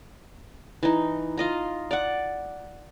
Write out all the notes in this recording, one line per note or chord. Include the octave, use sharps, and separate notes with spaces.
E3 D#4
F4 D#5 A#5
D5 F#5